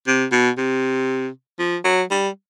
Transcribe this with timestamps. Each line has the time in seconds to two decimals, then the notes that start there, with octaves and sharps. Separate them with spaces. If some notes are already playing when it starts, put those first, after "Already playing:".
0.07 C3
0.32 B2
0.58 C3
1.59 F3
1.84 F#3
2.11 G3